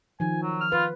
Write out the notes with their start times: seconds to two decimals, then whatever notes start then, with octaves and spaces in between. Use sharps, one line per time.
0.20 D#3 F3 G#5
0.42 F#3
0.61 F6
0.72 F4 B4